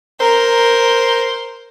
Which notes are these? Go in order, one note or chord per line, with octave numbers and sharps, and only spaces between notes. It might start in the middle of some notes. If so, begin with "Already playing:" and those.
A#4 C5